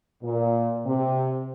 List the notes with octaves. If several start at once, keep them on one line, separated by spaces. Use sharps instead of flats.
A#2
C3